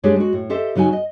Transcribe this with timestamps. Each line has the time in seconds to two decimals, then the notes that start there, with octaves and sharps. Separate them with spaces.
0.04 G#3 D4 G4 G#4 C#5
0.16 G#3 F#4
0.33 A2
0.50 G4 A4 C5 D#5 E5
0.75 C#3 F#3 D#4 F#4 G#5
0.93 D#5